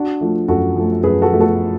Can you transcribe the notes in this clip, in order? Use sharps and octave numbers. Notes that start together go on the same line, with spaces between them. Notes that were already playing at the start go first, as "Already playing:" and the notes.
Already playing: D4 F#4
F3 A3
F#2 F#4 A4
F3 A3
F#2 G#4 B4
F#4 A4
F3 A3
F#4 A4